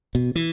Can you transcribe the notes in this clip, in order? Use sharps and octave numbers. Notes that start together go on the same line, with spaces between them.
B2
E3